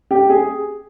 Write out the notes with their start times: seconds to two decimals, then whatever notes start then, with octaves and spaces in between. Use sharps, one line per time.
0.11 G4
0.30 G#4